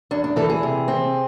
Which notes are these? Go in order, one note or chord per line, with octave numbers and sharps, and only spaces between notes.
E2 D4
D4
E3 A4
G#4
C3
C4